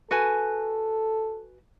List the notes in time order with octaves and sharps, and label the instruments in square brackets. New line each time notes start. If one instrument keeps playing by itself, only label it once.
[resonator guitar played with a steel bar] F#4 B4 G#5 [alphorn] A4